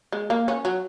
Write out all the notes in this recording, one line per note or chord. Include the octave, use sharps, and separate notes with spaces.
G#3
A#3
C#4
F#3